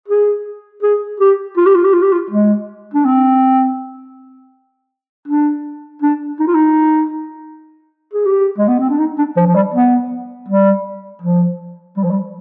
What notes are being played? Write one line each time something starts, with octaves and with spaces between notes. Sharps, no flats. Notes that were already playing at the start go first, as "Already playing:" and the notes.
G#4
G#4
G4
F4
G4
F4
G4
F4
G4
F4
G#3
D4
C4
D4
D4
D#4
F4
D#4
G#4
G4
G#3
B3
C4
D4
D#4
D4
F3
F3
G3
B3
G3
F3
G3
F3
G3